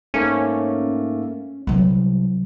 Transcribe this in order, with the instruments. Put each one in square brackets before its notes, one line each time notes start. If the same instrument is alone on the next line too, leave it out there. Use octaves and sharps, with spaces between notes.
[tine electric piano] G#2 A3 A#3 [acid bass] C#4
[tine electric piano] C2 [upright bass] C3 F#3